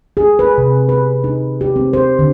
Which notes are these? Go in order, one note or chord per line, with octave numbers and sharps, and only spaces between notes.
G#4
B4
C3
B4
D#4
G4
C4
C5
D3